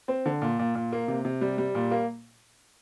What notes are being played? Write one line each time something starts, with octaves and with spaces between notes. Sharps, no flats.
C4
D3
A#2
A#2
A#2
A#3
C3
C3
G3
G3
A#2
A#3